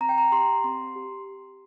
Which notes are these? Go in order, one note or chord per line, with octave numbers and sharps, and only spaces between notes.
C4 A#5
G5
A#5
G4 C6
C4 C6
G4